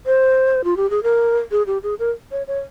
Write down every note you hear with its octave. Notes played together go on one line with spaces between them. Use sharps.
C5
F4
G4
G#4
A#4
G#4
G4
G#4
A#4
C#5
C#5